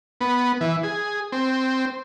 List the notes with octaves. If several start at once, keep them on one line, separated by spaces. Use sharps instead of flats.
B3
E3
G#4
C4